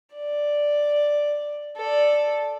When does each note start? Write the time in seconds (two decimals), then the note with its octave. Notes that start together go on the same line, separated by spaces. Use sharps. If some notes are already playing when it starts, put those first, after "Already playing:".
0.16 D5
1.78 A4 D5